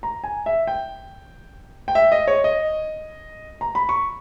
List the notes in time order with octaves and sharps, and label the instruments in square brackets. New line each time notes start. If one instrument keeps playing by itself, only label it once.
[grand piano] A#5
G#5
E5
G5
G5
E5
D#5
C#5
D#5
A#5
B5
C#6